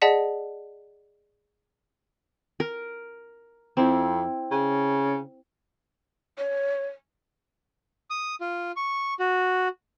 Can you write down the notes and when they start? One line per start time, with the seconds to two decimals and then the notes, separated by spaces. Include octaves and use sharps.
0.02 G#4 D5 D#5 F#5 A5 B6
2.60 A#4
3.77 F2 C4 E4
4.51 C#3
6.38 C#5
8.10 D#6
8.41 F4
8.76 C#6
9.20 F#4